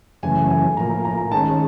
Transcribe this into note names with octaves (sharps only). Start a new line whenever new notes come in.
F#2 C#3 E3 A3 G#5
G#5
A2 F3 A#3 A#5
A#5
D#3 G#3 C#4 A5